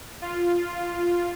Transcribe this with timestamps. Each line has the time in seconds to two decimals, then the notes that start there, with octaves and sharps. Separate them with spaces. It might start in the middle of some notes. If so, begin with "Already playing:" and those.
0.22 F4